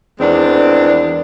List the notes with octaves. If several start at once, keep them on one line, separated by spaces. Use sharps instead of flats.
E2 D#3 G#3 C4 D4